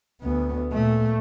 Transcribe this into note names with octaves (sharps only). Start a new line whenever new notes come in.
D2 B3
A#2 A3